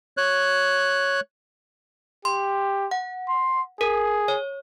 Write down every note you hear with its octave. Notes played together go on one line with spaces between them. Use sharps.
C#5 F#6
G4 C6
F#5
C6
G#4 A#4
C#5